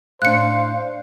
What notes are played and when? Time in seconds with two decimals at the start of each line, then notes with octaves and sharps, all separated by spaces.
0.22 A2 D4 C5 F5 F#6 C#7